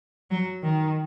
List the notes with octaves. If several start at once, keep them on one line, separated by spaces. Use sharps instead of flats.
F#3
D#3